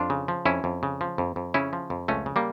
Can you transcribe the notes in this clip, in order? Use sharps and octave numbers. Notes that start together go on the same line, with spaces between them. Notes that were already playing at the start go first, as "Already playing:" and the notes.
Already playing: F2 D4 F4
C#3
F3
F2 C#4 E4
F2
C#3
F3
F2
F2
C#3 C#4 E4
F3
F2
C#2 A3 C#4
C#3
G3 A#3